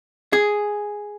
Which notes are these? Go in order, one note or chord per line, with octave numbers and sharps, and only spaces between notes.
G#4